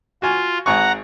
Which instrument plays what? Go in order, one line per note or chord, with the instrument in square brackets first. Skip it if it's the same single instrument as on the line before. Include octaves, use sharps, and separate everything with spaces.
[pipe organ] F4 [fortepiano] F#4 G#5
[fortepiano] G#1 G#5 C#6 [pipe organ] F#5 A#5